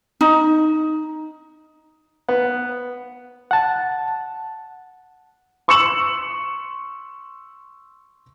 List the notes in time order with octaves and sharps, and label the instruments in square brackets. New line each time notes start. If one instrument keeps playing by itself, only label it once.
[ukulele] D#4
[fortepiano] B3
[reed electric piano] F#5 A5
[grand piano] C6 C#6 E6 C#7 E7 F#7